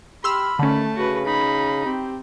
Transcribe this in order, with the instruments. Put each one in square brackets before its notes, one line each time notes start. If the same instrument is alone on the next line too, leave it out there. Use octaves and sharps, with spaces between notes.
[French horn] G4 [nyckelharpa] B5 [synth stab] C6 E6 F6
[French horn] D#2 [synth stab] D3 C#4 [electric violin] A3 A5
[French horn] C#3 [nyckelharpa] F#4 B4
[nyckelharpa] D#4 [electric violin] B5
[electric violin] C4 [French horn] G4